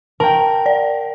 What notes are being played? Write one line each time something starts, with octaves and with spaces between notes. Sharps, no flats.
A#4 G5 A5
D5